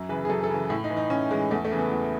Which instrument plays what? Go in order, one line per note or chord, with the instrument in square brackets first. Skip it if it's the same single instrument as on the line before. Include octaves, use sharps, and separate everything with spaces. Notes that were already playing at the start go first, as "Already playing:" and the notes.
Already playing: [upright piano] F#2
C#3 E3 B4
G#4
F#2 A4
A4
C#3 E3
A2 E4
D#4
E3
D#4
A2 C#4
E3 G#3
E2 A3
A3
C#3 E3
B3
E2